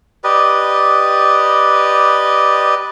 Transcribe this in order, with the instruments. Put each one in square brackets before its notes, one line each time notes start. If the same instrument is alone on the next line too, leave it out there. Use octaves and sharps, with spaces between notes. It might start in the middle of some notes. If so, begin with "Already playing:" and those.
[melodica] G4 B4 D5 D#5